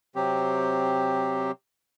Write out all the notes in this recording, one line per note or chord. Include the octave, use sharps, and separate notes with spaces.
C3 F#3 C4 G4